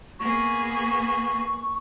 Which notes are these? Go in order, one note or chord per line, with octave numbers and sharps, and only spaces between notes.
A#3 B3 G#4 C#6